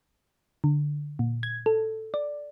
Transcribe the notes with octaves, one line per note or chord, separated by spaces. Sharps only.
D3
A#2
G#6
A4
D5